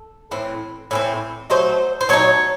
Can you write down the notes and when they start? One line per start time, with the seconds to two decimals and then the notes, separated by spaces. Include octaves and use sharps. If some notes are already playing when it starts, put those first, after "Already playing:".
Already playing: A4
0.31 A2 E3 C4
0.91 A2 E3 C4
1.50 F#3 A3 D#4 C5
2.01 C5
2.09 F#3 A3 D#4 C#5